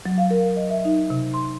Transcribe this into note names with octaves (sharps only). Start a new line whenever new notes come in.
F#3
F5
A#4
D#5
E5
D#4
C3
C6